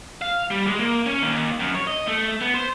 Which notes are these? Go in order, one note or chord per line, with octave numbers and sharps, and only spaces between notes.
F5
G3
G#3
A#3
C#4
D#2
F#2
C#5
D#5
A3
B3
C5